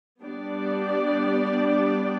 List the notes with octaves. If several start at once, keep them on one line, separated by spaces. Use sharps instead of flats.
G3 B3 D4 G4 D5